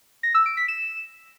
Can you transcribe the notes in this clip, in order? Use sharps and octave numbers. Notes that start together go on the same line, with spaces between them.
A#6
E6
D7
B6
E7